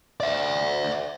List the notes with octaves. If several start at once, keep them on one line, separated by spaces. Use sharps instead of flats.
D5 E5